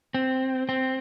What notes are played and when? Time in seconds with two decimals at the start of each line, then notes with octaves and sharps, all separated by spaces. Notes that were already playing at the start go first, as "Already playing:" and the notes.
0.15 C4
0.69 C4